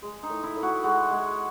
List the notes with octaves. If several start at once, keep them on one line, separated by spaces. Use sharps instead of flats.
G#3
D#4
A2
E4
A2
F#4
G#3 F#4
G#3